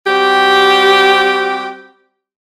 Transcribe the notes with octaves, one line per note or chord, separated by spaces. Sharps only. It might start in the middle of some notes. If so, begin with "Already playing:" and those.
G3 C4 F#4 G4